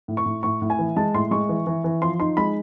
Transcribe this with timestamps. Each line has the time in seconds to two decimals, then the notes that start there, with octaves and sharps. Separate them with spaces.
0.08 A2
0.17 C#6
0.26 A2
0.43 A2 C#6
0.62 A2
0.70 G#5
0.79 E3
0.96 G#3 A5
1.14 A2 C6
1.31 G#3 C#6
1.49 E3
1.67 E3
1.84 E3
2.02 F3 C6
2.20 D#4 C6
2.37 G#3 B5